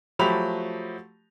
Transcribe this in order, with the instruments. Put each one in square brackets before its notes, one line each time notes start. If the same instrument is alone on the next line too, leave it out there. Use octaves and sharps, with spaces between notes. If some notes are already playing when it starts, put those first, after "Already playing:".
[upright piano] F3 F#3 A3 G4 B5 F7